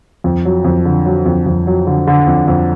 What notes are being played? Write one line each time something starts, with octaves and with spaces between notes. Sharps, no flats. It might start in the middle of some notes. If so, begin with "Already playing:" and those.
F2
F#3
F2
D3
F#3
F2
F2
F#3
D3
D3
F2
F2